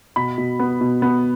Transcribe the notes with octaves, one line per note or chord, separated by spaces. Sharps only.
B2 B5
B2
B3
B2
B3